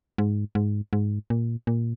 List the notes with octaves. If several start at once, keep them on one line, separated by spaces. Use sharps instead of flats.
G#2
G#2
G#2
A#2
A#2